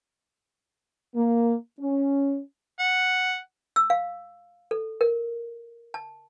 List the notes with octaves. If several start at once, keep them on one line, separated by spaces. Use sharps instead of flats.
A#3
C#4
F#5
E6
F5
A4
A#4
A5